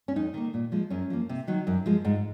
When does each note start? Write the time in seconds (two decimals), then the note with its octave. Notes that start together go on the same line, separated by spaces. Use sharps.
0.08 C#4
0.16 F2 D#4
0.34 D#3 A#3
0.54 A#2
0.72 F3 G#3
0.90 F#2 C#4
1.10 F3 A#3
1.29 C3
1.47 D#3 F#3
1.67 F#2
1.86 F3 G#3
2.05 G#2